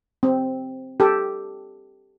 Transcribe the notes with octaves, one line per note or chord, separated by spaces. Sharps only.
C4
G4 A4